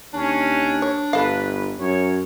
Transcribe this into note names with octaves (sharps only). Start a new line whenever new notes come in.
D#2 C#4 D4
C#5
G1 A4 B4 F5
F#2 C#5